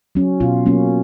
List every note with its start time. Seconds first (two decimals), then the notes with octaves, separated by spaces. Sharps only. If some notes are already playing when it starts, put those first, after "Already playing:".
0.15 F#3 C#4
0.40 B2 F4
0.66 F#3 A#3 C#4